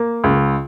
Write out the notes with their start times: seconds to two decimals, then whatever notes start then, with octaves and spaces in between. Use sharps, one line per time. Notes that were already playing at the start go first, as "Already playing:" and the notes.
Already playing: A#3
0.24 C#2